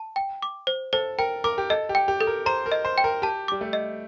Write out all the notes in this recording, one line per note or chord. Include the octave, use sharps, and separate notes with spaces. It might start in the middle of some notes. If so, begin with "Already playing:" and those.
Already playing: A5
G5
D6
C5
A4 C5
A#4 G5
A#4 D6
G4
A4 D#5
G4
G5
G4
A4
A#4
C5 A#5
A#4
D#5
C5
G5
A#4
G4 A5
G3 D6
A3
D#5